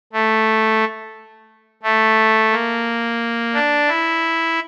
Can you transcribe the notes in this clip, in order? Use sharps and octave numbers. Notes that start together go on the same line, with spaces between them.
A3
A3
A#3
D4
E4